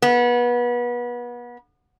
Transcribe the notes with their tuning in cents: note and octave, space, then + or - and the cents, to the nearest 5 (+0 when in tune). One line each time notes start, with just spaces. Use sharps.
B3 -30